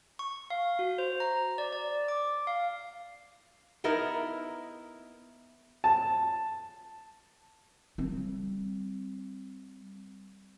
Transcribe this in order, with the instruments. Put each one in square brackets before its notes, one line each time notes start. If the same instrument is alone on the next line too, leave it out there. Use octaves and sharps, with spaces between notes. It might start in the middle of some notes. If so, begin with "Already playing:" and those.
[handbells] C#6
F5
F#4
C5
A#5
D5
D5
D6
F5
[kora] B3 D#4 E4 A#4
[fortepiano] A5
[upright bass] G3 C4